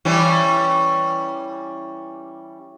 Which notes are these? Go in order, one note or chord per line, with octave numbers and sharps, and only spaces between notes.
E3 G3 C#4